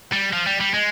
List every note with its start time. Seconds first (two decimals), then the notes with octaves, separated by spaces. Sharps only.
0.12 G3
0.33 F3
0.46 G3
0.60 G3
0.74 G#3